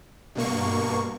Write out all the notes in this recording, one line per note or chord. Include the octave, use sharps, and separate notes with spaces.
G2 B2 A#3 C#6